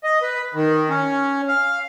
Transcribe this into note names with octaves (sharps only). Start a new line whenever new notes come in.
D#5
B4
D#3
C#4
F5